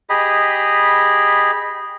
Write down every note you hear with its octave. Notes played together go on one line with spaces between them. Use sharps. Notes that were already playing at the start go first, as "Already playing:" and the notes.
G4 G#4 D#5 B5